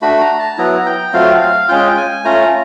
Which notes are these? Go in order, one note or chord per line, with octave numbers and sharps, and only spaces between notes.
A3 D4 F#4 B5
A#5
A5
F#3 B3 E4 A#5
G5
F#3 A3 C4 F4 F5
F5
G#3 C#4 F4 G5
G5
G#5
A3 C#4 F4 A#5